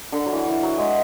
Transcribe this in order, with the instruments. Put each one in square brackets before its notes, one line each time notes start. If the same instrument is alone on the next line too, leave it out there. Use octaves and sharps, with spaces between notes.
[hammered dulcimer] D3
F#3
E3
E3
F#3
G#3